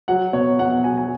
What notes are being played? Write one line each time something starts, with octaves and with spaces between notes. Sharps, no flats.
F#3 F#5
B2 C#5
B2 F#5
F#5
F#3 G#5
G#5